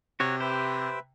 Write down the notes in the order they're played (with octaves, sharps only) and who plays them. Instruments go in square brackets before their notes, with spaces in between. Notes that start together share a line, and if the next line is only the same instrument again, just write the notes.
[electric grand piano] C3 [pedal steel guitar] F#4 C#5
[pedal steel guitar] G4 C5 [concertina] B4 E5